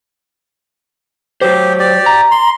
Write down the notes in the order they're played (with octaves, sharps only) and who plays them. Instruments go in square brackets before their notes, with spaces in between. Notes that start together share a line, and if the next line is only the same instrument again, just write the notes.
[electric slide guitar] F#3 C5 [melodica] G4
[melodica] G4 D5
[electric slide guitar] A#5
[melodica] C6